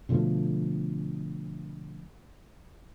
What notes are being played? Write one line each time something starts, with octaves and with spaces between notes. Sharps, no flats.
B2 D3 F3 A3